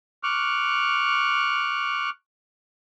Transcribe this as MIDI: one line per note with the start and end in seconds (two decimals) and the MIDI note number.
0.23 2.10 85
0.23 2.10 86
0.23 2.10 89
0.23 2.10 90